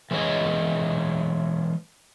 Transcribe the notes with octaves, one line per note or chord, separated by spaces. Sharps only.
E3 G#3 C#4 C#5 D#5